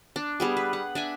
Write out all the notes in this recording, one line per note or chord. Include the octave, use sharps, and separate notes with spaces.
D4
G3 B3 G#4
B4
F#5
D4 E5 G#5